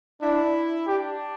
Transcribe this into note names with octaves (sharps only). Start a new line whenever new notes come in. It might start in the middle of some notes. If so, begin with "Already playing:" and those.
D4 E4
D4 G4